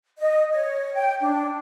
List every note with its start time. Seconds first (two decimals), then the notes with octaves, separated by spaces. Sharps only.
0.18 D#5
0.52 C#5
0.94 G5
1.20 D4